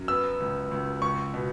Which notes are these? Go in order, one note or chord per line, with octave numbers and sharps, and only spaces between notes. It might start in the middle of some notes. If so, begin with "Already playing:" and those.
Already playing: F#2
B3 E6
C#2
C#2
C#2 C#6
B2